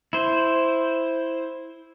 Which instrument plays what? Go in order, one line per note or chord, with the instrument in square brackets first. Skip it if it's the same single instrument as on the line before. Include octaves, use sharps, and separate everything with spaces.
[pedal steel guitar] E4 C5